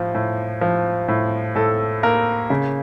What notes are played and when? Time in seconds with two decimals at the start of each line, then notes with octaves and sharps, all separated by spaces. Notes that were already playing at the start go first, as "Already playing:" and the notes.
Already playing: A2 F3
0.15 A2
0.61 F3
1.08 A2
1.55 A2 A4
2.03 A#3 A#4
2.50 C#3